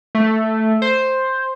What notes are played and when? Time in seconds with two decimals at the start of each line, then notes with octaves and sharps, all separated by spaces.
0.15 A3
0.82 C5